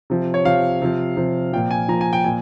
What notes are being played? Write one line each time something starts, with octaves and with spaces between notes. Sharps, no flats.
C3 F3
C#5
C3 F3 F5
C3 F3
C3 F3
A#2 F3 G5
G#5
A#2 F3 A#5
G#5
G5
A#2 F3 G#5